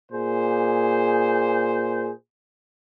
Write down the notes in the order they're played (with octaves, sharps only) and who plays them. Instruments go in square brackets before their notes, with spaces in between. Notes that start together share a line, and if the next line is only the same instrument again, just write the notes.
[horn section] A#2 G#4 C5